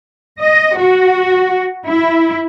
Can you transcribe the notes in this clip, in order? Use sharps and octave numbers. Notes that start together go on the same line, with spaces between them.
D#5
F#4
E4